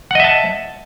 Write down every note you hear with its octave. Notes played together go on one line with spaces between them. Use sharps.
D#5 E5 F#5 A5